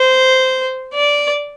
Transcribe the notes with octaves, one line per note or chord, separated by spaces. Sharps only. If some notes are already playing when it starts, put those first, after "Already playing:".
Already playing: C5
D5